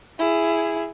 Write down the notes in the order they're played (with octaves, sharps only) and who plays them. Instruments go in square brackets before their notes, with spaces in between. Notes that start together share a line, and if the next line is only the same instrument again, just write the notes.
[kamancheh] E4 G#4